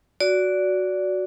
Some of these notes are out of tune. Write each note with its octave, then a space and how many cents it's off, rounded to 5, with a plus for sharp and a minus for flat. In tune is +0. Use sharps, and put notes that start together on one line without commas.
F#4 +0 D5 -15